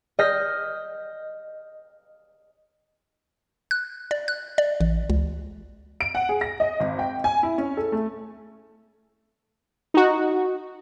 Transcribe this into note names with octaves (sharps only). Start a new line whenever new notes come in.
D#5 F6 G6 A#6 B6
F#6
D5
F#6
D5
A1
C#2
D7
F#5
G#4
A#6
D#5
G#1
G5
G#5
E4
C#4
A4
A3
D#4 F#4